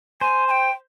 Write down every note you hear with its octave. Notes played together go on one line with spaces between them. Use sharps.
C5 G#5
G#5
G5